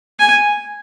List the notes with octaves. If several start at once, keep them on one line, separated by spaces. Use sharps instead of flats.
G#5